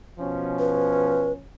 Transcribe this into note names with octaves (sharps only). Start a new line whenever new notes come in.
B2 F3 C#4
B4